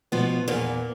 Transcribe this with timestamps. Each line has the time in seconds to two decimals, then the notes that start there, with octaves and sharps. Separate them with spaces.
0.12 B2 F3 B3
0.48 E2 A#2 A#3